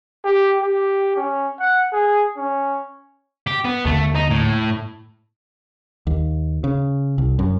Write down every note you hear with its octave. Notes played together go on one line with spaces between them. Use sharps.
G4
G4
C#4
F#5
G#4
C#4
G4
B3
D#2 D3 A3 A#3
D#4
A2
D#2
C#3
C2
F#2